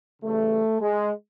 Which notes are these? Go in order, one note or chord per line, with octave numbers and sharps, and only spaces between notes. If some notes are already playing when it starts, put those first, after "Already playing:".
C#3 E3 G3 A3
G#3